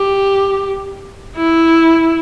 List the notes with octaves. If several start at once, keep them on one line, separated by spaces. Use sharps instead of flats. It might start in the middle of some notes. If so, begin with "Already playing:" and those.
Already playing: G4
E4